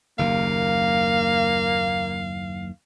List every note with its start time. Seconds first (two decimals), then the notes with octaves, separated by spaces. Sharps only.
0.19 F#1 D#2 A#3 F5